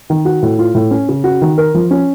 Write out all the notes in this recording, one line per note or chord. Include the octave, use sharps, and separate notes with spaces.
D#3
F#4
A2
F4
A2
C#4
C#3
F#4
D#3
A#4
F3
C#4